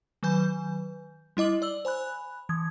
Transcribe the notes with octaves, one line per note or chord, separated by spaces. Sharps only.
D#3 F#3 B4 G#5 G6
G3 E4 D#5 D6 F#7
D5 E6 F#7
C5 G#5 B5 F#6
E3 D#6 G#6